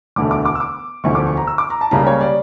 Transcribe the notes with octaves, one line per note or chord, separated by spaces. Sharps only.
E1 D2 D3 A3 D6
D6
D6
E6
D6
E1 D2 D3 F3 C#6
D6
C#6
A#5
E6
D6
A#5
A5
C#2 C#3 G3 A#3 A#5
C#5
D5